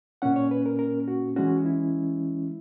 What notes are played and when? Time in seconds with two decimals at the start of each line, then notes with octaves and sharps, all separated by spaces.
0.22 A#2 A#3 C#4 F#5
0.36 C#5
0.51 B4
0.66 A#4
0.79 A#4
1.08 F#4
1.36 E3 G#3 C#4 F#4
1.65 E4